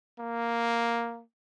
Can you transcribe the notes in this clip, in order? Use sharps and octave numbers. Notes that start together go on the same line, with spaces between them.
A#3